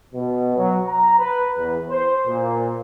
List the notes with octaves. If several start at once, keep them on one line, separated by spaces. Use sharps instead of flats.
B2
F#3
A#5
B4
E2
C5
A#2